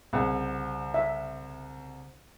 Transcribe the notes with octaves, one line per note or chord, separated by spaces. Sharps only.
C2 C#3 C5 F#5
E5